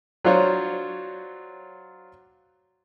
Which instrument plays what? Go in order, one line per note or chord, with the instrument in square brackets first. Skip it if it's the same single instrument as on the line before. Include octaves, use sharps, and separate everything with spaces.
[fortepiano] F#3 D4 F4 C5 C#5